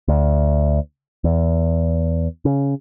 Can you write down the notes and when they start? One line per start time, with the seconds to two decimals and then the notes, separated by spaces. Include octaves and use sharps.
0.08 D2
1.24 E2
2.45 C#3